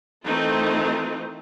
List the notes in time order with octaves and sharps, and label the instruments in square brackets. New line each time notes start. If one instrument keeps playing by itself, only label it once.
[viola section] D#3 E3 A3 C4 D#4 F4